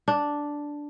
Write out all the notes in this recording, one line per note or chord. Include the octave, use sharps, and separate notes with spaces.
D4